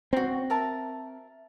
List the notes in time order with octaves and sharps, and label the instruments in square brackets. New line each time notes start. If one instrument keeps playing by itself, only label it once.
[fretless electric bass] C4 [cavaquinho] D#4 F#4
[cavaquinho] A#4 E5 A5